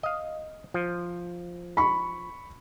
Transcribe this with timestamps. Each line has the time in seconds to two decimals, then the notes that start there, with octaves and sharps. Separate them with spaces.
0.03 D#5 F5
0.74 F3
1.77 B5 C#6